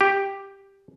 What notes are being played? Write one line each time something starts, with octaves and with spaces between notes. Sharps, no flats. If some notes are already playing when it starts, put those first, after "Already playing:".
G4